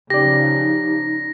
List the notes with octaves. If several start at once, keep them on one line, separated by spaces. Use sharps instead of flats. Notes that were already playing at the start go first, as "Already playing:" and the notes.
C#3 F3 D#4 G4 D5 A#6